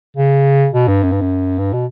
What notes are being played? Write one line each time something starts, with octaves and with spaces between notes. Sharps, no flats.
C#3
B2
G2
F#2
G2
F#2
G2
B2